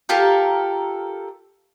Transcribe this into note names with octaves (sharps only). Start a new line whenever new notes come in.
F4 G4 A4 A#4